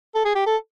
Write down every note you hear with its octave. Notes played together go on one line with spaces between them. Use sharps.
A4
G#4
G4
A4